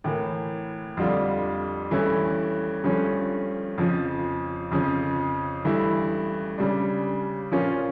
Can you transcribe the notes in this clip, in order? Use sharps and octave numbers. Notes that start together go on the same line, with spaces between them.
A2 E3 A#3
F2 D3 G3 D4 F4
G2 E3 A3 C#4 E4
G2 F3 A3 C#4
F2 C#3 F3
F2 C#3 F3
G2 E3 A3 E4
C#3 G3 D4
A#2 F3 C#4 F4